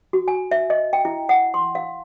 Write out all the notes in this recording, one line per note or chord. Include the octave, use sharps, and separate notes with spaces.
F#4
G#5
E5
D#5
G5
E4
F#5
C6
F5